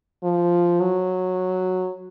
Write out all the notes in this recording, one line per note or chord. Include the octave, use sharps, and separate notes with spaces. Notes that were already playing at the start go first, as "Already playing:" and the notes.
F3
F#3